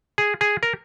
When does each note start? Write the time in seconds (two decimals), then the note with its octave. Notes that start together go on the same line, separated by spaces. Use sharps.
0.18 G#4
0.41 G#4
0.63 A#4